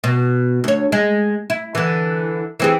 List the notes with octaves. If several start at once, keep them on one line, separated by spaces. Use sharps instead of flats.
B2
D2 C#5
G#3
E4
D3 E3
E3 C4 G#4